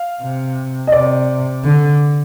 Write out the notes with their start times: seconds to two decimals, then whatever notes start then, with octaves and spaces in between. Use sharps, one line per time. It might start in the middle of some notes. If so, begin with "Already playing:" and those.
Already playing: F5
0.21 C3
0.87 D#5
0.92 C3 D5
1.64 D3